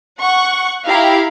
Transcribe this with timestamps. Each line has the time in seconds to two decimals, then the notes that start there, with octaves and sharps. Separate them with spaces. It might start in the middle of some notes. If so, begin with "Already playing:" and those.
0.20 F#5 C#6
0.87 E4 G4 F5 A#5